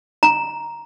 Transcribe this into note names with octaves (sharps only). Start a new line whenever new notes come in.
A#5